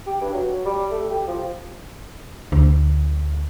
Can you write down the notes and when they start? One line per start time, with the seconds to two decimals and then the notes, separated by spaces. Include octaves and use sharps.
0.07 G4
0.21 G2
0.33 F#3
0.65 G3
0.91 A3
1.10 G4
1.27 F3
2.52 D2